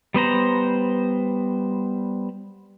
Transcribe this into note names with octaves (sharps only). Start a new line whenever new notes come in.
G3 B3 C5 A#5